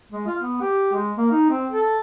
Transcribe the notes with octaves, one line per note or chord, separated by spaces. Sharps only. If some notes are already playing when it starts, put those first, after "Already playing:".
G#3
F4
B3
G4
G#3
A#3
D#4
C4
A4